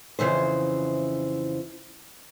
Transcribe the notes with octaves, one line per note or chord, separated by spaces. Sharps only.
F2 C#3 E3 C5